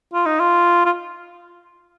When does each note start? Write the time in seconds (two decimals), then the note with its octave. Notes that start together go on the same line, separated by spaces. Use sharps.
0.13 F4
0.26 D#4
0.40 F4
0.86 F4